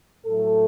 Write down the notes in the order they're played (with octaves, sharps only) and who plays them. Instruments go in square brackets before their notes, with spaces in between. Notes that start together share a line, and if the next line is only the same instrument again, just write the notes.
[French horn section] A2 F#3 A3 A4